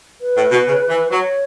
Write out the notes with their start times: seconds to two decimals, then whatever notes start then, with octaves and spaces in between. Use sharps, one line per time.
0.21 B4
0.37 A2
0.51 B2
0.66 C#3
0.89 E3
1.11 F#3 C#5